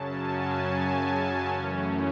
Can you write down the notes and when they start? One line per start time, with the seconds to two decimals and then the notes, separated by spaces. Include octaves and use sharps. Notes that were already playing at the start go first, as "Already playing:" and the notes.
Already playing: F#2 C#3 F#3 C#4 A5
0.08 G#5
0.55 A5
1.47 F#2 E3 A3 C#4